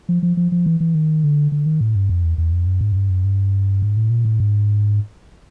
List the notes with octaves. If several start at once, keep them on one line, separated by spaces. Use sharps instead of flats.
F3
F3
F3
F3
E3
E3
D#3
D3
D3
D#3
A2
G2
F2
E2
E2
F2
F#2
G#2
F#2
G2
F#2
G2
G#2
A2
A#2
A2
G#2